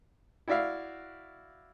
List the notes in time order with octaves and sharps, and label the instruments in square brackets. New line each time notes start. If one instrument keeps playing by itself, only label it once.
[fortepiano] E4 F#4 D5 E5 F5